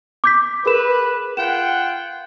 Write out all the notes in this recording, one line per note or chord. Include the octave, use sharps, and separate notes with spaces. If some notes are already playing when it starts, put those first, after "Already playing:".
D6 G6 B6
G#4 A#4 B4 E7
F4 F#5 G5 E7